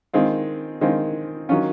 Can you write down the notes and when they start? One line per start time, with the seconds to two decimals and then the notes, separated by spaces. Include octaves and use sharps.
0.13 D#3 G#3 C4 F4
0.81 D#3 G#3 C4 F4
1.49 D#3 F#3 C#4 F4